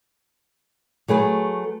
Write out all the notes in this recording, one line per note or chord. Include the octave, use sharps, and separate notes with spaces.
F#3 A3 G#4 B4